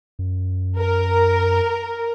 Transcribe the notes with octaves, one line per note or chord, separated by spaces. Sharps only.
F#2
A#4